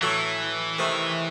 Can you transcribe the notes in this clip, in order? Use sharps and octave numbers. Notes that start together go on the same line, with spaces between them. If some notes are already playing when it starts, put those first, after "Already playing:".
A2 E3 F#3 A3
C3 D#3 A3